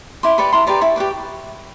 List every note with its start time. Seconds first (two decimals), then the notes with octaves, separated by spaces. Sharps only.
0.23 E4 C6 D6
0.38 G4 B4 D5 B5 C#6
0.53 E4 A#5 C6
0.67 G4 B4 D5 A#5 C6
0.81 E4 B5 C#6
0.96 G4 B4 D5